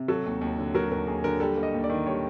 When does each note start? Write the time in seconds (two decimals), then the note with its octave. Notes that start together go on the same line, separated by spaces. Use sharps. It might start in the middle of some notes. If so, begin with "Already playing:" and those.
Already playing: C3
0.08 F#3 A4
0.26 D#2
0.41 D#2
0.59 D3
0.74 F#3 A#4
0.91 D#2 A#4
1.07 D#2 G#4
1.24 D3 A#4
1.40 G3 A4
1.57 A#3
1.63 D#5
1.74 D#2
1.84 D5
1.90 D#3
2.06 G3 C#5